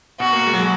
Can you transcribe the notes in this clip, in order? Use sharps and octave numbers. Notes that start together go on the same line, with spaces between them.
B2 F#4
A#3
G#3
F#3
G#3